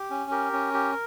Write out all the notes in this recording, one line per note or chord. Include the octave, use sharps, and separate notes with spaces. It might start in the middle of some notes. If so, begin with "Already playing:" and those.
Already playing: G4
C#4
G4 A#4
C#4
G4